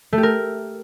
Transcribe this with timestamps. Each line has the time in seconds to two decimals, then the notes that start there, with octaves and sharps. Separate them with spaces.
0.13 A3
0.18 G4
0.23 A#4